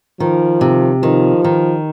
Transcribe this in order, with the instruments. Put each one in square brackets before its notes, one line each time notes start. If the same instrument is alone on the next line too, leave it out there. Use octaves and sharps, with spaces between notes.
[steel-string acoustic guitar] D#3 [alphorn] F3
[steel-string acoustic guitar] C3
[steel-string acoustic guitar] D#3 [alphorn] F3
[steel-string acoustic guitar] D#3